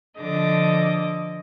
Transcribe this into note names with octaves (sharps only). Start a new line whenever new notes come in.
D3 F3 D#5 D6 A#6